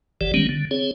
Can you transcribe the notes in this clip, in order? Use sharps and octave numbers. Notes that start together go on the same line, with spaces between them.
F#1 E3 G4 D5
D#3 G3 G#3 B3 C#4
D3
C4 G#4 C#5